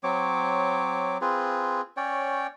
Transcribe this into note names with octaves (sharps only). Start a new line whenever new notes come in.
F#3 C4 C#5 D6
C4 F4 G#4 B4
C#4 C#5 D5 G5